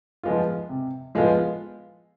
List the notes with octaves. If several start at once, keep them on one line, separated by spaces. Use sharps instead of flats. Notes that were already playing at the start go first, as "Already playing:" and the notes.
F3 G#3 B3 F4
C3
F3 G#3 B3 F4